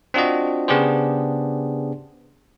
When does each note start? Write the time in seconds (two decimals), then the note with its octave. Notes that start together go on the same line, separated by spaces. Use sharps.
0.14 C4 D4 F4 F#4 D#5
0.68 C#3 B3 D4 G4 G#4 C5